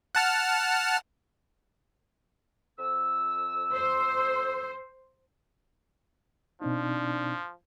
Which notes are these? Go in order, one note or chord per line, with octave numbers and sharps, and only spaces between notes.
F#5 A5 F6
F2 E6
C5
B2 F3 C4 D4 D#4